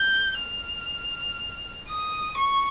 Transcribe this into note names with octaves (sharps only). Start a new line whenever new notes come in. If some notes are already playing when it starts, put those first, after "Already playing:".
Already playing: G6
F6
D#6
C#6